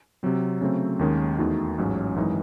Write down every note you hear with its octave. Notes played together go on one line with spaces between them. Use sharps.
C3 F#3 C4
C#3 F#3 A3 C4
D#2 D#3 G#3 C#4
E2 D#3 A3 D#4 F#4
A1 G#2 F#3 C#4
G#1 F#2 E3 G#3 D#4